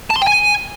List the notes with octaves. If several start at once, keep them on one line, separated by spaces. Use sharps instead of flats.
A5
C6
G5
G#5